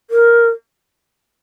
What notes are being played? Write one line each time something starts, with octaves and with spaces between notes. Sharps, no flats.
A#4